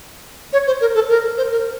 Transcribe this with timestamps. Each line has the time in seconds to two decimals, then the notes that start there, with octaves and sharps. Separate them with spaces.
0.53 C#5
0.67 C5
0.81 A#4
0.95 A4
1.09 A#4
1.37 C5
1.51 A#4